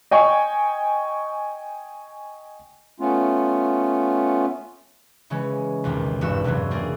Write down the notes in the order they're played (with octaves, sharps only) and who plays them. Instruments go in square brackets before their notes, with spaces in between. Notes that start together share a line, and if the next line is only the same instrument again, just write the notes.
[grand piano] D#5 G5 G#5 C#6
[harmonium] A3 B3 C#4 F4
[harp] C#3 E3 G#3 C#4
B1 E2 C3 D#3
G#1 G2 E3 F#4 E6 E7
E2 G2 C3 E3 F#3
A#3 C4 D4 G#4 A#4